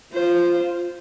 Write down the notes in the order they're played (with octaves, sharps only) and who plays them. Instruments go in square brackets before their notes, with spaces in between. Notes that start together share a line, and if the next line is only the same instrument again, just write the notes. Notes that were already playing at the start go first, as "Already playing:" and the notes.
[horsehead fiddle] F4 [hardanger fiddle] C5